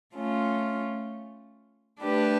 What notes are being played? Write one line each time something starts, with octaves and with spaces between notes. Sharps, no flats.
A3 C#4 F4
A3 D4 G4 B4